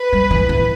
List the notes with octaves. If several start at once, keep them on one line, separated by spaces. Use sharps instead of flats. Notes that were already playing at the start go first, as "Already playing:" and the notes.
Already playing: B4
G3
E3
E3